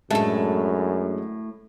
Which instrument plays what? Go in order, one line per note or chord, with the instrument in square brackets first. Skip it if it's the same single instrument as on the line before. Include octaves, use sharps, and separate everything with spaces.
[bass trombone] F#2 [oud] A2 A4 [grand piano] G#3 D4 [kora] A3